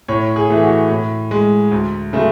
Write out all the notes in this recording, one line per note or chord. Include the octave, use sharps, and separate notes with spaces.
A2 C#5
G#4
E3 A3
F#4
A2
G#3
D2
C#3 F#3 A3